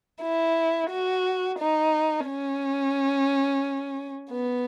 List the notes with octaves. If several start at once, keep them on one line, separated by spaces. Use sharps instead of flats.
E4
F#4
D#4
C#4
B3